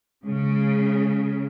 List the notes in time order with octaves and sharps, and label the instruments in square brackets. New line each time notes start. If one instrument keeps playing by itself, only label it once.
[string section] C#3 [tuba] G#3